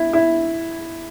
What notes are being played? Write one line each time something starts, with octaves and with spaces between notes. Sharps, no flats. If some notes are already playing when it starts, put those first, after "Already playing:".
Already playing: E4
E4